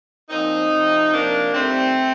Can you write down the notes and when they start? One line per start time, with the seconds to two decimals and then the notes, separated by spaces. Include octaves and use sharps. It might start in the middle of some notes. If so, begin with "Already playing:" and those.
0.30 A#2 F3 C4 D#4
0.72 C3 F3
1.13 C3 F3 A#3 D4
1.54 C3 D#3 G3 A3 C4